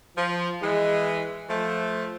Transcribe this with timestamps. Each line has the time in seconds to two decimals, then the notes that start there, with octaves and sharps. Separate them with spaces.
0.18 F3
0.62 E3 G#3
1.49 F3 A3